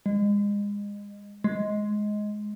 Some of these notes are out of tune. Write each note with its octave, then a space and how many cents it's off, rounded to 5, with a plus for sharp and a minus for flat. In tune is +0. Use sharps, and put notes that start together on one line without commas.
G#3 -30
G#3 +10